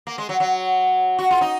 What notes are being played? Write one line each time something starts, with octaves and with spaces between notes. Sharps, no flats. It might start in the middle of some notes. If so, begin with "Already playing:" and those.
A#3
G#3
F#3
F#3
F#4
F4
D#4